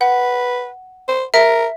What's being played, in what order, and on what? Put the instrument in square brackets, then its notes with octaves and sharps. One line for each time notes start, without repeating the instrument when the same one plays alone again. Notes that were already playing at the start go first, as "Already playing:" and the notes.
[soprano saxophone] B4 [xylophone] F#5
[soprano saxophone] C5
[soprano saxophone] A#4 [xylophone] E5